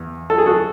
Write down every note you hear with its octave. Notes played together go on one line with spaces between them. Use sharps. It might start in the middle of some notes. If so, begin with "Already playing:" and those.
Already playing: E2
A4
G#4
F#4 A4